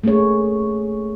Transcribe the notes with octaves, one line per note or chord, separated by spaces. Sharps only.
A3 A#3 C#4 G#4 C#5